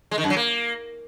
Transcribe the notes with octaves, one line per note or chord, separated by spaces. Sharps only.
G#3
D#3
F#2
F#3
A#3